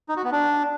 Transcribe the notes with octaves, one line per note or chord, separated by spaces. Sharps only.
D#4
F#4
B3
D4